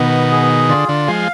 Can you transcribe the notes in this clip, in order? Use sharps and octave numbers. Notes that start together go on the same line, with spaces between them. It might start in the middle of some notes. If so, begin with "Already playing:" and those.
Already playing: B2 D#3 B3
G#4
D3 F4
D3
F3 G#3 F5